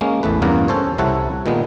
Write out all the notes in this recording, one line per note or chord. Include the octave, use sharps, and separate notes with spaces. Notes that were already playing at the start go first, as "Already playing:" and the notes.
G#3 A#3 C#4
A1 E2 A3 B4
E2 G2 C#3 A#3 A#4 F#5
C#4 A4 C5 C#5
C2 C3 E4 A4 C#5 F#5
A#2 D#3 G#3 B3